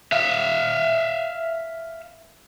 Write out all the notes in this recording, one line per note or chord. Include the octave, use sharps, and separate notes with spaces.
E5 F5